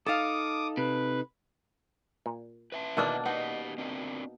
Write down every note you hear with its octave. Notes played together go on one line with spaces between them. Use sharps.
D#4 A4 F5 A5 D6 D#6
C3 B4
A#2
B4 E5 A5
B2 D#3 E3 A#3 B3 D4
B3 D#4 G4 D#5 F#5
C4 D4 A#4